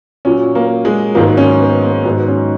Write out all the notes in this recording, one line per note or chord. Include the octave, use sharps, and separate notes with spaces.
A#2 F#3 C#4
A#3
G#3
G#2 D#3 F#3 A#3
C#4
B3
A#3
G#2 D#3 F#3 B3
C#4